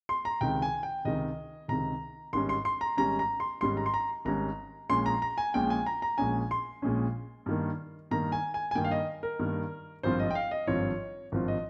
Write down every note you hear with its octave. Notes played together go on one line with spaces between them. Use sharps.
C6
A#5
C#2 C3 D#3 G5
G#5
G5
C#2 C3 D#3 D#5
C#2 C3 D#3 A#5
G#1 G#2 G3 C#4 C6
C6
C6
A#5
G#1 G#2 G3 C#4 A#5
A#5
C6
G#1 G#2 G3 C#4 C6
A#5
C6
A#5
G#1 G#2 G3 C#4 A#5
A#1 A#2 G#3 C#4 C6
A#5
A#5
G#5
A#1 A#2 G#3 C#4 G5
G#5
A#5
A#5
A#1 A#2 G#3 C#4 G#5
C6
A#1 A#2 G#3 C#4
G2 D#3 A#3
G2 D#3 A#3 A#5
G#5
G#5
G#5
G2 D#3 A#3 G5
F5
D#5
A#4
G2 D#3 A#3
G#1 G2 F3 C4 F4 C5
D#5
G5
F5
D#5
G#1 G2 F3 C4 F4 C#5
G#1 G2 F3 C4 F4
D#5